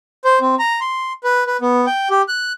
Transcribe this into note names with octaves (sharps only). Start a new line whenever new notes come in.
C5
C4
A#5
C6
B4
B4
B3
G5
G4
F#6